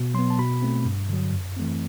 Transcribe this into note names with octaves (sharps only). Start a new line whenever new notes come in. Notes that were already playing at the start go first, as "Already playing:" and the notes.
Already playing: B2
F#3 B3 C6
A5
B2 B5
A3 C4
G2
D3 F#3
F#2
E3 A3 C4